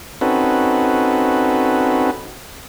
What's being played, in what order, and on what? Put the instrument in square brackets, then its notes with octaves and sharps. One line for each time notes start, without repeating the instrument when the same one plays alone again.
[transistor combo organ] C4 C#4 D#4 F#4 A4 B4